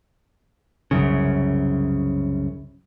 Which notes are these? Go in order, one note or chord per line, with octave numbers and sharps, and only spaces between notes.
C2 F#2 C#3